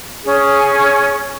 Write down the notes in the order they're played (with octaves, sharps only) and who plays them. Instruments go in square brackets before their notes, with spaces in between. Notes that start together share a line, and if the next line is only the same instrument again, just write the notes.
[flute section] C#4 G#4